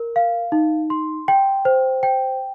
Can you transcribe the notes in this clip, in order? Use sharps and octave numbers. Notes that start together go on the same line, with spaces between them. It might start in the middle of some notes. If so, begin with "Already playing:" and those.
Already playing: A#4
F5
D#4
C6
G5
C5
G5